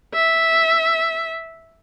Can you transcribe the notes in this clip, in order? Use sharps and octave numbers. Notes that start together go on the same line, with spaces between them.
E5